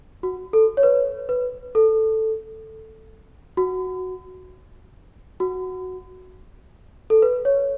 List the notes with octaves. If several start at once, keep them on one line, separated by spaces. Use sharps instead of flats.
F#4
A4
C#5
B4
B4
A4
F#4
F#4
A4
B4
C#5